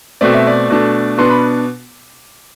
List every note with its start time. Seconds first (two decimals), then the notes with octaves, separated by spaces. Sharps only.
0.21 B2 A3 C4 D5
0.34 E5
0.47 D5
0.70 B2 A3 D4
1.17 B2 B3 D4 C6
1.30 B5